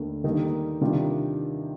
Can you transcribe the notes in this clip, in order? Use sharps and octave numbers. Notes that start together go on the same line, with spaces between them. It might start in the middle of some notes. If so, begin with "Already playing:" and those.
Already playing: D#2 D3 A3
D#3 G3 A#3 D#4 A4
C3 D#3 G3 D4 F4